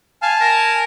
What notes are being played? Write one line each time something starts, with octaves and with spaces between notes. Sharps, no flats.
F5 G#5 A5
A#4